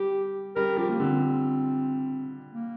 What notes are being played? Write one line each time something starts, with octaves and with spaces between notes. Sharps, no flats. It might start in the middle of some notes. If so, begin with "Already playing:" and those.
Already playing: G3 G4
G3 A#4
F3 G4
A#3
D3 C4
A#3